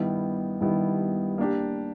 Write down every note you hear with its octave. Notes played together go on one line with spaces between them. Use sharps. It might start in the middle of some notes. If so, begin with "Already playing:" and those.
Already playing: G2 D#3 G3 B3 E4
G2 D#3 G3 B3 E4
A#3 D4 G4